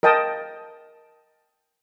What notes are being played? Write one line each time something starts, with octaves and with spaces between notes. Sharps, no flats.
A#4 D#5 G5 A5 D#6